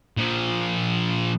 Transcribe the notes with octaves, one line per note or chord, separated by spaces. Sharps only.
A#2 F3